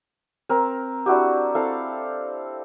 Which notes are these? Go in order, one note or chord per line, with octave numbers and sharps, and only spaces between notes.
C4 A#4
D4 E4 F#4 G4
C4 E4 A4 F5